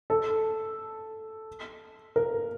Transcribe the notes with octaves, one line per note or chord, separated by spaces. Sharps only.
A4
A#4